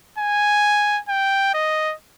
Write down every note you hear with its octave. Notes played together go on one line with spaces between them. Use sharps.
G#5
G5
D#5